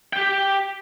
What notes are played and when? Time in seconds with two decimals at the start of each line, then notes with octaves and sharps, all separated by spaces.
0.13 G4 G5